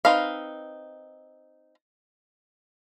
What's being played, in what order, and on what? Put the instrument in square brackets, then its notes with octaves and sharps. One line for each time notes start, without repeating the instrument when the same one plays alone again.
[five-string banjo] C4 D#4 B4 F5